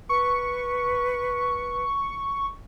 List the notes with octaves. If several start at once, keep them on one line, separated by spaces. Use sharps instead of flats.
B4 C#6